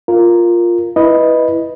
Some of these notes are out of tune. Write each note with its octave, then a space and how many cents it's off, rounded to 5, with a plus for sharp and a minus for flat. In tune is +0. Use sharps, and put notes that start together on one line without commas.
F4 +0 A#4 +0
E4 +0 B4 -5 D#5 +0